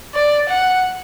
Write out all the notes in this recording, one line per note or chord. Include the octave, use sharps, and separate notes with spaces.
D5
F#5